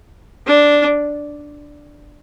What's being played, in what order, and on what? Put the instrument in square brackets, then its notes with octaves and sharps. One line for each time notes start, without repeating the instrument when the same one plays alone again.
[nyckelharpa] D4